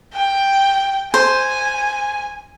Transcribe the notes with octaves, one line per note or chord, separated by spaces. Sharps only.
G5
C5 G#5